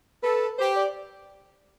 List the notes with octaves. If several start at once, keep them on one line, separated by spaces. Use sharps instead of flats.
A4 B4
G4 C5
D5